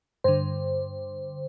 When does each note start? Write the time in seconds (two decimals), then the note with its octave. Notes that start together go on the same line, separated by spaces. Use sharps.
0.24 G2 D3 C5